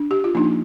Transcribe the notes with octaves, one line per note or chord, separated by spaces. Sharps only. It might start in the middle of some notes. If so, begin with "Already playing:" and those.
Already playing: D4
G4
F4
F3 A#3 D4 D#4